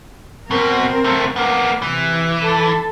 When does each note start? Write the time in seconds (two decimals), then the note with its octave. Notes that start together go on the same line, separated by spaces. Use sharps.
0.51 B2 C4 A#4
1.05 C3 A3
1.36 A#3 B3
1.82 C3 E3
2.42 A4